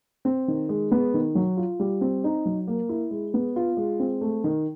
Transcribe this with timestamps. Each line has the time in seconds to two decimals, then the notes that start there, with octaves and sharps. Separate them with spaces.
0.25 C4
0.48 D#3
0.69 G#3
0.91 B3
1.14 D#3
1.35 F#3
1.57 F4
1.80 G3
2.01 C4
2.24 D#4
2.46 F#3
2.67 A#3
2.89 E4
3.11 G#3
3.34 B3
3.56 F4
3.77 G#3
4.00 C4
4.21 A3
4.44 D#3